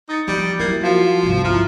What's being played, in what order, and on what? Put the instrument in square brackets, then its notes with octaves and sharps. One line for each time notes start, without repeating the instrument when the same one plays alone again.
[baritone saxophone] D#4 [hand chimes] D#6 A6 C#7
[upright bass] F3 [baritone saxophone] G3
[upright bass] F#3 [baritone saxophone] A#3 [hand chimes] E4
[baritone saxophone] F3 [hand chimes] F#4 F5 C7
[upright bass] G1 C2
[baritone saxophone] F3 [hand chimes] E4 A#5 F6